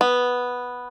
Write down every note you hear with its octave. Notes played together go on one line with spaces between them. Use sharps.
B3